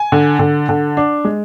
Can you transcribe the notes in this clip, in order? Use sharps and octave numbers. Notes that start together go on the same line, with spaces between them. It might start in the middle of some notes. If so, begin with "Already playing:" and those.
Already playing: G#5
D3
D3
D3
D4
G#3